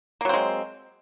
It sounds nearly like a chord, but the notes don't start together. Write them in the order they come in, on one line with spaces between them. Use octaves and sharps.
A#3 F#3 C4 G#3